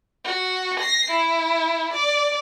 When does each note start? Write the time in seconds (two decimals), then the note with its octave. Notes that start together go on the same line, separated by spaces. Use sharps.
0.25 F#4
0.80 A#6 C7
1.11 E4
1.94 D5